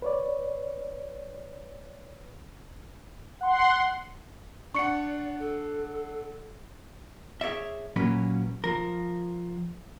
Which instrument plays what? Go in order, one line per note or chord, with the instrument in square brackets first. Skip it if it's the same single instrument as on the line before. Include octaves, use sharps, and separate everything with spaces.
[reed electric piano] B4 C#5 D5
[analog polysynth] F#5 C6
[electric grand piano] D4 F#5 [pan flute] D5 [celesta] C#6 C#7
[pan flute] A4
[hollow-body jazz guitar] G#4 C#5 D5 E5
A#2 F#3 A#3 C#4 B4
F3 A#4